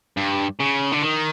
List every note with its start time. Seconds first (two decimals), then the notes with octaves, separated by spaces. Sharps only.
0.17 G2
0.60 C#3
0.92 D3
1.02 D#3